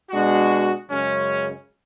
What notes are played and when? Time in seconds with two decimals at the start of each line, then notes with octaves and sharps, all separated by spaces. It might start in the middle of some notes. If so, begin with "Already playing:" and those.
0.11 B2 G#3 D4 F#4
0.88 F#2 C#3 G#3 C#4